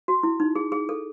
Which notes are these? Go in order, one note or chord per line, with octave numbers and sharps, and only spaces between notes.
F#4
E4
D#4
G#4
G#4
A4